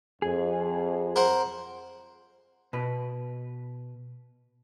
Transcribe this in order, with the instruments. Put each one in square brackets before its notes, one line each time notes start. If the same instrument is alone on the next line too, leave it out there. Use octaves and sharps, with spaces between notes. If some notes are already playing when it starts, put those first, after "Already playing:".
[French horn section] F2 [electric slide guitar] G#4
[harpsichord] A#4 C5 F#5
[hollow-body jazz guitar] B2 B4